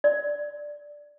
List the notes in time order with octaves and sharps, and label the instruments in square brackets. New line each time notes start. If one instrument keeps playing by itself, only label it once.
[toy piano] D5